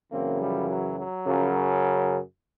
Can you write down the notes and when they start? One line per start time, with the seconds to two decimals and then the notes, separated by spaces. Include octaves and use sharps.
0.11 F#2 C#3 E3 A#3 C4
0.40 F3 G3
0.69 F#3
0.97 F#3
1.26 F#2 C#3 F3